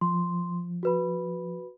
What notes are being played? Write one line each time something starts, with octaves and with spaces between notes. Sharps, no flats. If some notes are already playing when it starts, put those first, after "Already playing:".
F3 C6
F#4 B4 B5